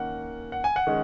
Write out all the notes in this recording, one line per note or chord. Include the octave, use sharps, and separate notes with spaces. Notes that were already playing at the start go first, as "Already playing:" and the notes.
Already playing: D#3 A#3 C#4 F#5
F#5
G#5
F#5
D#3 G#3 C#4